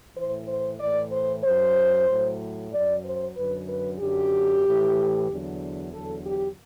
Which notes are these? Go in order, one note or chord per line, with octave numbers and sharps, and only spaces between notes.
A2 E3 C5
C5
A2 E3 D5
C5
F#2 F#3 C5
A2 F#3
F#2 F#3 D5
C5
F#2 D3 F#3 B4
B4
F#2 D3 F#3 G4
A2 E3
E2 D3 F#3
E2 D3 F#3 A4
G4